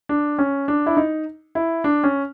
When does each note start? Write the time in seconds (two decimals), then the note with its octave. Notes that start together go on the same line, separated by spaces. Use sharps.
0.09 D4
0.39 C#4
0.68 D4
0.86 E4
0.97 D#4
1.55 E4
1.84 D4
2.04 C#4